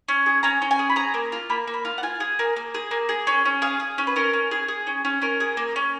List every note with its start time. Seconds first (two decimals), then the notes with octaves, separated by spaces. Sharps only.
0.08 C#4
0.26 G#4
0.43 C#4 A#5
0.62 C#4
0.71 G#5
0.79 G#4
0.90 B5
0.96 G#4 A#5
1.14 A#3
1.32 F4
1.50 A#3 B5
1.67 A#3
1.74 B5
1.85 F4
1.98 F#5
2.03 F4 G#5
2.20 G#4
2.39 A#3
2.56 A#3
2.74 G#4
2.91 A#3
3.09 G#4
3.27 C#4
3.45 C#4
3.62 G#4 F5
3.80 G#4
3.98 C#4
4.07 B4
4.16 C#4 A#4
4.33 C#4
4.51 G#4
4.68 G#4
4.87 C#4
5.05 C#4
5.22 C#4 A#4
5.40 G#4
5.57 A#3
5.76 C#4